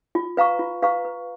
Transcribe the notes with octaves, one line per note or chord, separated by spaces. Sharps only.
F4
B4 F5 A#5 C#6
F4
B4 F5 A#5 C#6
B4